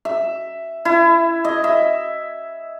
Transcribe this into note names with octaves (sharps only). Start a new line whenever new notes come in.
E5
E4
D#5
E5